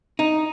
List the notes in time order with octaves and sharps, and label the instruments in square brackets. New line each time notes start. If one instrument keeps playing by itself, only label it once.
[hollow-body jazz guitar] D#4